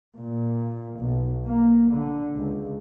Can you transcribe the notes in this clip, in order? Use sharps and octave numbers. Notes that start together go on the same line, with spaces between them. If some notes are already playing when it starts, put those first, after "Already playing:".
A#2
B1
A#3
D3
C#2